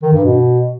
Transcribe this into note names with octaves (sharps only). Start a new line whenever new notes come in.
D#3
G2
B2